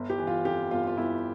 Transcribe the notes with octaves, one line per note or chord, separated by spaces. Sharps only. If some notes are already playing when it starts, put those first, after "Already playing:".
Already playing: G1
G4
E3
F4
F2 G4
G1 F4
F4
G1 E4